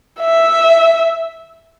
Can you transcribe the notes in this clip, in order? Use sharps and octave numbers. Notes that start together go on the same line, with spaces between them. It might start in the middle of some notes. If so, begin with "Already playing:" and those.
E5